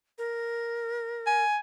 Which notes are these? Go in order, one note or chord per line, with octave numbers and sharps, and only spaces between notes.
A#4
G#5